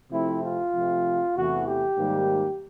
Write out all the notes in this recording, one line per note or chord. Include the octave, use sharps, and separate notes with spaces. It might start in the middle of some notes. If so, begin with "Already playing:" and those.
C3 F3 A3 C4 E4
F4
C3 F3 A3 C4
E2 C3 E3 A3 F#4
G4
G#2 D#3 G3 A#3